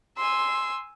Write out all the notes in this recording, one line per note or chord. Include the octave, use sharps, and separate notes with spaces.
G#5 C6 E6